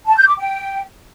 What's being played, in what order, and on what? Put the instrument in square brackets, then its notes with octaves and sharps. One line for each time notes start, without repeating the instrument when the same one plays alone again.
[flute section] A5
G6
D6
G5